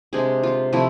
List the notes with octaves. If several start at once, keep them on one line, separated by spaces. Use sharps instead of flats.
C3 G#3 D4 G#4
F4
C3 F3 A3 E4